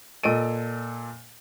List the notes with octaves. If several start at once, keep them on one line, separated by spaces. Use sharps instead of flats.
A#2 A4 D#5 D7 D#7